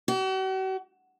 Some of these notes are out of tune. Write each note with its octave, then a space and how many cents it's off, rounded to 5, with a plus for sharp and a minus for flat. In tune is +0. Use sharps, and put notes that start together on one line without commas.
F#4 +45